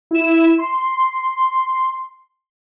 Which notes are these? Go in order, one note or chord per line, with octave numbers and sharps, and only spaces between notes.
E4 E7
C6